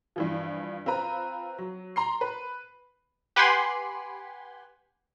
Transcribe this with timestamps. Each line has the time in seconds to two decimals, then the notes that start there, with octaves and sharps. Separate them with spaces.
0.16 G2 E3 F3
0.86 C4 F4 B4 A#5
1.58 F#3
1.96 A#5 C6 C7
2.21 B4
3.36 G4 B4 F#5 G#5 B5 C6